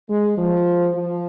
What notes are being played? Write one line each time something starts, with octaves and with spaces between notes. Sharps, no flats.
G#3
F3
F3